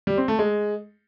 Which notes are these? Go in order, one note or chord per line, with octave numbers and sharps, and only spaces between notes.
G3
C4
A3
G#3